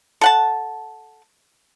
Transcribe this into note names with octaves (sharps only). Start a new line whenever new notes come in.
A4 F#5 A5